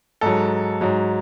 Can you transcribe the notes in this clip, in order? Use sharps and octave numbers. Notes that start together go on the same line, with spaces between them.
G#2 F#3 A4
G#2 F#3